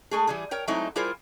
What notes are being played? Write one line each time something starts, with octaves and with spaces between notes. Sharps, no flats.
G#3 A3 G#4
E3 G3 G#4
A#4 C#5 G5
F#3 G#3 A3 C4 D#4 E4
G3 E4 F4 G#4 A#4 C5